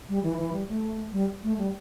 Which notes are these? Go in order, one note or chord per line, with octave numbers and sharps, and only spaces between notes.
G3
E3
E3
G3
A3
G3
A3
G3